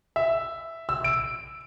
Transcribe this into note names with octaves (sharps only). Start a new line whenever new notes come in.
E5
E6
D7